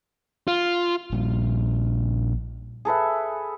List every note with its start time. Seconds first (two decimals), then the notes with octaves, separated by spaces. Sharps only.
0.48 F4
1.12 A#1 A#2 G3
2.85 G#4 A4 B4 E5